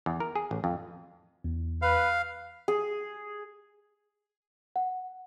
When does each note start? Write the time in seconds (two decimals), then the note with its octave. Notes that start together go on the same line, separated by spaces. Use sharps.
0.06 E2
0.20 A#4
0.35 G#4
0.51 A1
0.64 F2
1.44 E2
1.82 B4 F5
2.68 G#4
4.76 F#5